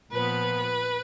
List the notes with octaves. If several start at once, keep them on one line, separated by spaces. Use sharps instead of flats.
A#2 F3 B3 B4